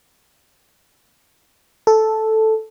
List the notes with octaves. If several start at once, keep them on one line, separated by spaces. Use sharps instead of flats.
A4